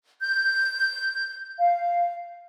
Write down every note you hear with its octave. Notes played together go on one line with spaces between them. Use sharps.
G6
F5